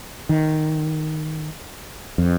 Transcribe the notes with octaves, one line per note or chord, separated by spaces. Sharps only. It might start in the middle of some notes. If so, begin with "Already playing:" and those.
D#3
F2